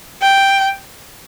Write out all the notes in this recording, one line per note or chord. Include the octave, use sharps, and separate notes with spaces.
G5